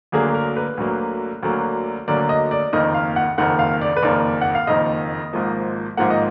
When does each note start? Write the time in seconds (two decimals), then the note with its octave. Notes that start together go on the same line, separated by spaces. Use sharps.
0.12 D2 D3 F#3 A#3 G#4
0.34 A#4
0.57 B4
0.77 D2 D3 F#3 A#3
1.43 D2 D3 F#3 A#3
2.08 D2 D3 F#3 A#3 D5
2.29 D#5
2.51 D5
2.73 F#1 F2 D#3 A#3 D#5
2.94 F5
3.16 F#5
3.38 F#1 F2 D#3 A#3 F#5
3.59 F5
3.81 D5
3.97 B4
4.03 F#1 F2 D#3 A#3 D5
4.41 F#5
4.55 F5
4.67 F#1 F2 D#3 A#3 D#5
5.33 G#1 G#2 F3 A#3
5.97 G#1 G#2 F3 A#3 F#5
6.10 D#5